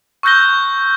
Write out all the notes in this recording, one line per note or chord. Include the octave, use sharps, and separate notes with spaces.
C#6 E6 F#6 G6 A#6 G7